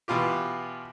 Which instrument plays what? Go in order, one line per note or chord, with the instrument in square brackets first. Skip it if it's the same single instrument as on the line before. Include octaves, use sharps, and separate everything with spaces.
[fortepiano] B2 E3 F4 G4